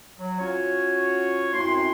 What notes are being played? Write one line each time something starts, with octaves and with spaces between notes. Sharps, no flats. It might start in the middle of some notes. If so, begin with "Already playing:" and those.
F#3
C#4 F4 F#4 C#5
F#2 A3 C4 E4 F#4 C6